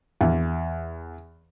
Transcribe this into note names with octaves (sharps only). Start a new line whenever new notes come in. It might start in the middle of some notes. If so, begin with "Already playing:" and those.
E2